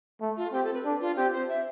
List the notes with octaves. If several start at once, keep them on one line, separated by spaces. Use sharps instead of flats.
A3
F4
C4 G4
A4
B4
D4
F4
C4 G4
C5
E5